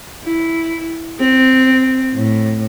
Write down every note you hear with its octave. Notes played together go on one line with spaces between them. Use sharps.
E4
C4
A2